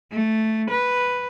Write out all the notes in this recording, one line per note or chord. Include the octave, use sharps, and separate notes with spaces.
A3
B4